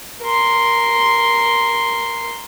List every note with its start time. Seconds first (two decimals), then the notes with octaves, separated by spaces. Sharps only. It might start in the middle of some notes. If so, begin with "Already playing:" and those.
0.22 A#4 C6